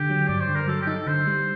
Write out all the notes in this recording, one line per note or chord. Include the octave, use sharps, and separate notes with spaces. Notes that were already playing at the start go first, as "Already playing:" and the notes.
Already playing: D3 G4
F#3
G2 D5
C5
D3
A#4
F#3 A4
G4
D#4 A4
D3 C5
G3